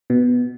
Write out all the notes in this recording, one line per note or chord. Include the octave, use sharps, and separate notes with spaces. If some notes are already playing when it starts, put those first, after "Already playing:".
B2